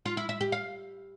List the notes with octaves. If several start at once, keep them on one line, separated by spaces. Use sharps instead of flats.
F4
E4
E5
G4
F5